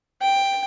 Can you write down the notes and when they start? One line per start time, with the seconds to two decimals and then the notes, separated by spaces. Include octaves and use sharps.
0.22 G5